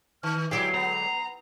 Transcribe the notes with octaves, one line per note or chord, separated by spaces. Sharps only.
D#3 F6
D3 F#3 G#3 E4 G4 C7
B3 A#5